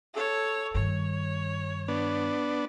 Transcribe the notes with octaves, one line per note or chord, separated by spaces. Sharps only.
A4 C#5
G2 D#3 C#5
B3 D4